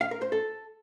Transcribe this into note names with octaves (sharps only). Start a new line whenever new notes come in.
F5
A#4
C5
A4